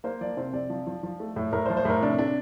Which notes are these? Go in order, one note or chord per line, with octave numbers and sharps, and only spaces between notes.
A#3 C5
F3 D5
C3 C5
C3 D5
F3
F3
F3
A3
A2
A2 A#4
C5
F3
C5
A2 A#4
C3 D4
C3 D4